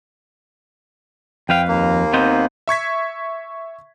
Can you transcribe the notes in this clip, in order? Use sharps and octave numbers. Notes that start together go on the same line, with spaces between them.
F2 B4 F5 G5
D#2 A#3
B3 C4 D#4
E5 C#6 G#6 B6